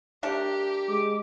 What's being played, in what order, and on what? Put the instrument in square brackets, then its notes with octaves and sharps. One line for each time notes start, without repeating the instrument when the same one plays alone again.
[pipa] A3 D4 A#4 [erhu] G4
[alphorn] G#3 [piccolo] D6